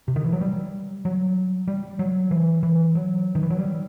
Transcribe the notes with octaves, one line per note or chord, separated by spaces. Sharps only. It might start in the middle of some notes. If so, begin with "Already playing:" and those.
C3
D#3
E3
F#3
G3
F#3
G3
F#3
E3
E3
F#3
D#3
E3
F#3
G3